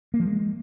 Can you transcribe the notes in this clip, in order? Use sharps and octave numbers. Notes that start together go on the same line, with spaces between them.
A#3
F3
G#3